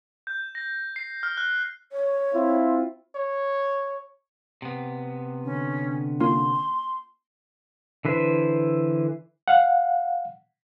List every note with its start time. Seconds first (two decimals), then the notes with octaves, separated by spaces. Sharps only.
0.27 G6
0.55 A#6
0.96 C7
1.23 F6
1.37 F#6
1.92 C#5
2.34 C4 E4 F4
3.15 C#5
4.62 C3 B3
5.45 D3 C#4
6.20 A#3 C#4 F4 C6
8.05 D3 E3 B4 C5
9.48 F5 F#5